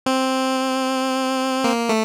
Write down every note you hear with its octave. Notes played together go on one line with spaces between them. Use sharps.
C4
A#3
A3